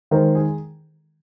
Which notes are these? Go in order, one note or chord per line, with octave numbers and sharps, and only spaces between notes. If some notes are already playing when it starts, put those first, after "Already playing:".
D#3 G#3 A#4 C5
G#4